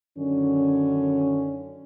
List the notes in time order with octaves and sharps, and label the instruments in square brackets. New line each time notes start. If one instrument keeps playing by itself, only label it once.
[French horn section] F#2 D3 D#3 C#4